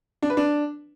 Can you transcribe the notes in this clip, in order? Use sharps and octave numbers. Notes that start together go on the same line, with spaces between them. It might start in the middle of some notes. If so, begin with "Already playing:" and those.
D4
B4
D4